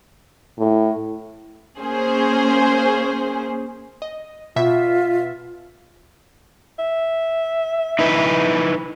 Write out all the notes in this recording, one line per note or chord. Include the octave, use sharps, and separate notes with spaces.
A2
A#3 C#4 G#4 C5
D#5
B2 F4 E5 B6
E5
D#4 E4 B4